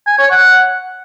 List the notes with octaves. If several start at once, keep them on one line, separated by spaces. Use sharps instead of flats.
G#5
C#5
F#5